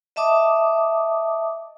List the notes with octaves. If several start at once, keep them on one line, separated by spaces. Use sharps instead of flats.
D#5 E5 A5 D6 D#6